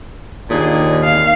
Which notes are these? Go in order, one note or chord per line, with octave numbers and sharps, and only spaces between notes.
D#2 A#2 D4 G#4
F5